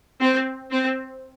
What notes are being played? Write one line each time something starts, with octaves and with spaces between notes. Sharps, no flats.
C4
C4